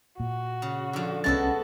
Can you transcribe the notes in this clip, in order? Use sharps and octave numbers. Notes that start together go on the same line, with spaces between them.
A#2 F#4
C#3
D3 F3
C2 G#3 B3 C#4 F#4 A4 A5 A6